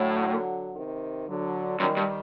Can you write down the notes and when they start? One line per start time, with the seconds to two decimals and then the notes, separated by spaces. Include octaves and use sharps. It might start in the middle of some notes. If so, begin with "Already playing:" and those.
Already playing: A2 D3 F#3
0.75 C3 D#3
1.28 D3 F#3
1.79 F#2 D#3 G3
1.97 G2